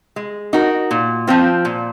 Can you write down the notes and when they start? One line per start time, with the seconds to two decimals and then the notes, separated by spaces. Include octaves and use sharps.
0.16 G#3
0.53 D#4 F#4 A#4
0.91 A#2
1.27 F3 C4 F4
1.65 A#2